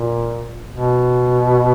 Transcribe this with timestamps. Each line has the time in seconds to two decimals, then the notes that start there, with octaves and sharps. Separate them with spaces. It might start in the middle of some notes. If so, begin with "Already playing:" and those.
Already playing: A#2
0.71 B2